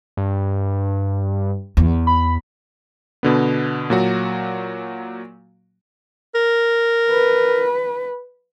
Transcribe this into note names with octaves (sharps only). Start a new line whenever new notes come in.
G2
E2
B5
B2 D3 B3
A#2 F#3 F#4
A#4
B4